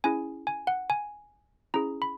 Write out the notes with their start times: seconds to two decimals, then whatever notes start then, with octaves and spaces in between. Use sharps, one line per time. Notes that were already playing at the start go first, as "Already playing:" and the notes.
0.04 C#4 E4 G#4 G#5
0.47 G#5
0.67 F#5
0.90 G#5
1.74 C#4 E4 G#4 A#5
2.02 B5